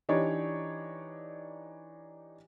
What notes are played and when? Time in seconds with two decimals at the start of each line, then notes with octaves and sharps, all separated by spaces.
0.09 E3 D4 D#4 G4 C#5 D5